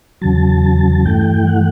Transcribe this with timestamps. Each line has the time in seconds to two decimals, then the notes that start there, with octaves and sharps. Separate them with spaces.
0.21 E2 C#3 F#3 A5
1.06 G2 E3 A3 G5
1.47 F#5